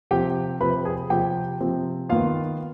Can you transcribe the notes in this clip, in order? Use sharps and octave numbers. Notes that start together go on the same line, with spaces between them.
C3 F3 C4 G4 G5
C3 F3 C4 B4 B5
G#4 G#5
C3 F3 C4 G4 G5
C3 F3 C4
D#3 B3 F4 F5